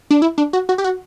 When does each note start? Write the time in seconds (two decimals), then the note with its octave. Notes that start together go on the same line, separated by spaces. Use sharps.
0.11 D4
0.22 E4
0.38 D4
0.53 F#4
0.69 F#4
0.78 G4
0.84 F#4